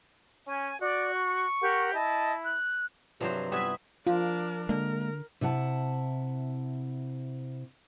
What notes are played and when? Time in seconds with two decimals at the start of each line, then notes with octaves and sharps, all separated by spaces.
0.47 C#4 G#5
0.82 F#4 D5
1.14 C#6
1.60 G4 A#4 F#5
1.93 E4 D#5 A5
2.45 F#6
3.21 G2 C3 F3 F#3 C5
3.52 G2 B3 E4 B4 E5 G#5 D#6
4.07 F3 D4 F4 A#4
4.69 D3 G#3 A#3 A#4
5.41 C3 E4 F#5 A5